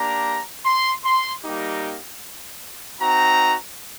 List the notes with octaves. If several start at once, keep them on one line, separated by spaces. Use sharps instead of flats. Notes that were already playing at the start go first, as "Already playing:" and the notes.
Already playing: A#3 D4 G4 A#5
C6
C6
G3 A#3 D#4 G4
C4 D#4 F#4 A#5